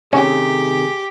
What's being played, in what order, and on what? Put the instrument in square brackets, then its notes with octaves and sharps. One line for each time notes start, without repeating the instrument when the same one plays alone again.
[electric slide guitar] C3 D#3 A3 [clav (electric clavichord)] C#4 [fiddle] G4 [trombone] G#4